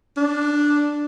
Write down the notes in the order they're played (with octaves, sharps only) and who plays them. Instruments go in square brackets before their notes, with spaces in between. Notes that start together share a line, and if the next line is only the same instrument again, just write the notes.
[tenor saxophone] D4